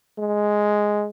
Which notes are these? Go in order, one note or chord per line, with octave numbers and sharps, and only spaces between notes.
G#3